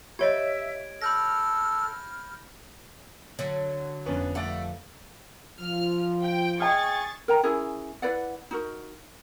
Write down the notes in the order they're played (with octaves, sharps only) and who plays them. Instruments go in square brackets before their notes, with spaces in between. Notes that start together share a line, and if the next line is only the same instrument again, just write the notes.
[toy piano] G4 C#5 D#5 [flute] E5 [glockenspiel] G#6 D7
[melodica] A4 [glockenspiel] B5 G6 A#6 [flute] F6
[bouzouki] D3 F#3
[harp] G1 F2 A#3 [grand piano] B3 C#4 D4
[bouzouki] A3 [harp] A4 B4 F5 [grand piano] D5 F#5
[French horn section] F3 [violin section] F6
[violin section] G5
[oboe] G#4 [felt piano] D#5 G5 F6 [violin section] C#6 A6
[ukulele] A#4 G5 A#5
C#4 E4 G#4 A#4
E4 B4 D5 F#5
D#4 F#4 A#4